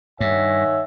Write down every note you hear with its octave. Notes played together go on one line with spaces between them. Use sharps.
G2 D#3 C#5 E5 F#5 G#5